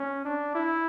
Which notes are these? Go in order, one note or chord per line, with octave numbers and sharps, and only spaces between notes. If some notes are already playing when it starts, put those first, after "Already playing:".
Already playing: C#4
D4
E4